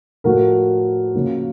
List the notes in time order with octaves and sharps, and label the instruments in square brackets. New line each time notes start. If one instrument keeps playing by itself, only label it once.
[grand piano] A2 F3 A3 F#4 A#4
C#3 F3 A#3